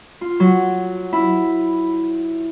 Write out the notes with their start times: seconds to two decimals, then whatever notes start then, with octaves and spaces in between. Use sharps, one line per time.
0.21 F4
0.40 F#3
1.13 E4